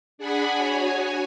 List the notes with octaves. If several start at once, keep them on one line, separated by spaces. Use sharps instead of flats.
D4 G#4 F#5 G#5 B5
F#4 C#5 G#5